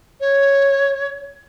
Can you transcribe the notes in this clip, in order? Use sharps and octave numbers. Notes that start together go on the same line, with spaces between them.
C#5